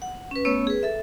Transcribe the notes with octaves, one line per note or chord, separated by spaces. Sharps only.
F#5
C#4 B4
A3 B3 C#4 C#5 C#6 E6
G#4 B4
A4 E5